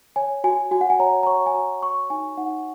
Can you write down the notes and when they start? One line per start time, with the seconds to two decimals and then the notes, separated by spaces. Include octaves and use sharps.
0.16 C#5 G#5
0.44 F#4 G#5
0.71 F#4 G#5
0.81 F#5
0.90 G#5
0.99 C#5 A#5
1.23 A#5
1.27 C#5 C#6
1.46 G#5
1.54 F#4 A#5
1.83 C#5 C#6
2.10 D#4 G#5
2.38 D#4 F#5